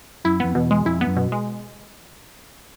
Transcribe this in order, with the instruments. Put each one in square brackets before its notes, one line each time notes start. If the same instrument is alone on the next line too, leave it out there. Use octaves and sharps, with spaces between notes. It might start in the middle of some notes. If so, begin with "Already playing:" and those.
[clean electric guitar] F#2 [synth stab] E4
[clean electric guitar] F2 [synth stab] B3
[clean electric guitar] E2 [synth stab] B2
[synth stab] G#3
[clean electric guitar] F2 [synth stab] E4
[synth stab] B3
[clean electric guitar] F#2
[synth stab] B2
G#3